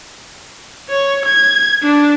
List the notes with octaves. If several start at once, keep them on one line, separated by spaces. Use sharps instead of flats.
C#5
G#6
D4